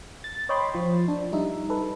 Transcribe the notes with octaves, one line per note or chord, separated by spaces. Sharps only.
A6
C#5 D#5 G5 B5 C6
F3
D4
G3 D#4 E5
A4 B4